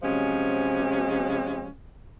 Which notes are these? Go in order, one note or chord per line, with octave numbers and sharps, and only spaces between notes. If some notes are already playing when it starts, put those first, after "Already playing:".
C3 F3 F#3 G#3 C#4